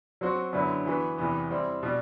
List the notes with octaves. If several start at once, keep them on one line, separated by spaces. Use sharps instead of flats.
F#3 C4 F#4 C5
F#2 D3 F#3 B3 E4
E3 B3 F#4 B4
E2 C3 E3 B3
G3 C4 E4
B2 G3